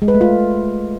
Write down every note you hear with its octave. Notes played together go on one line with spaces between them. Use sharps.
G#3
B4
A3
F4